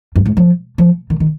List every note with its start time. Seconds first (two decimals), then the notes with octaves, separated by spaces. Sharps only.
0.15 G2
0.25 G#2
0.37 F3
0.78 F3
1.10 D#3
1.20 D#3